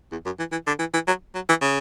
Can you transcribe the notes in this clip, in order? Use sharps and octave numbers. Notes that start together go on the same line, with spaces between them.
E2
F#2
E3
E3
D3
E3
E3
F#3
F#3
E3
C#3